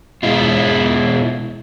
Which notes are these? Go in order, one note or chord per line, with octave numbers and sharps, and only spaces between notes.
B2 G#3 E4 F4